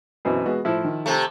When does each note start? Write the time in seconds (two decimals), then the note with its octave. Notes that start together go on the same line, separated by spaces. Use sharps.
0.25 F#2 B2 E3 C4
0.46 G#3 B3 F#4
0.65 A2 F3 E4
0.84 D#3
1.06 C3 A3